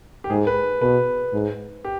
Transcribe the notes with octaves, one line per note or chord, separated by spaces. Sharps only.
G4
G#2 G#4
B4
B2 B4
G#2
G4